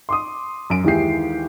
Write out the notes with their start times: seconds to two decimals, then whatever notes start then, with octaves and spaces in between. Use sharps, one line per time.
0.09 C6 D6 D#6
0.70 F#2 D7
0.84 D#2 D#3 E3 G#3 G4 C7